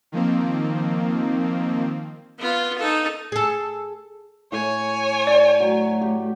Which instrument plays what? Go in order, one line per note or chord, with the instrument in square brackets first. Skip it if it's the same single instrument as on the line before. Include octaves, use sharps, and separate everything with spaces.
[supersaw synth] D#3 F3 A#3 C4
[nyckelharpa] B3 F4
D#4 A4
[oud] G#4 A4
[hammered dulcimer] A2 [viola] C#5 G#5
[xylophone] D5
[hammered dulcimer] F#3 [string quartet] A3
[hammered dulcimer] G4